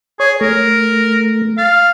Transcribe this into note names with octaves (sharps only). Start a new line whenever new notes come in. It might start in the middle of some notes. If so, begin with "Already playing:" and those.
G#4 C#5
A3 A#4
F5 A6